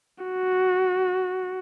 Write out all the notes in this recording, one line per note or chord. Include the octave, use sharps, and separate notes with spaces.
F#4